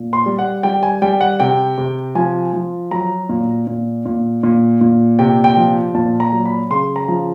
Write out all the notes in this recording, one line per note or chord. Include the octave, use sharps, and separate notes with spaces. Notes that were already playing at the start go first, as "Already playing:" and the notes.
Already playing: A#2
C6
G3
F#5
G3 G5
G#5
G3 G5
F#5
C3 G5
C3
F3 G#5
F3
F#3 A#5
A#2
A#2
A#2
A#2
A#2
C3 G5
G5
F3
A#2 A5
A#5
F#3
B5
C#3 C6
A#5
F3